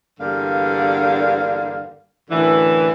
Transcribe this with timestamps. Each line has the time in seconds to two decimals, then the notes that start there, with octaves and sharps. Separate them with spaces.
0.19 E2 G2 D3 G3 A#3 F5
2.30 F#2 A2 D3 E3